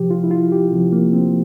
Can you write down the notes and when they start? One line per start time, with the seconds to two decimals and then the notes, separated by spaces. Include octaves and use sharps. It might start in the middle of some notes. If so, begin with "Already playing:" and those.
Already playing: C3 F3 G4
0.11 F4
0.24 E4
0.31 F4
0.52 G4
0.72 C3 F3 C4
0.92 A#3
1.13 C4